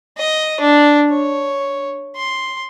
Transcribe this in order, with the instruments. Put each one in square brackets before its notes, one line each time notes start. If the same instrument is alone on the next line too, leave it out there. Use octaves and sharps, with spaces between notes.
[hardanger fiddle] D#5
D4
C#5
C6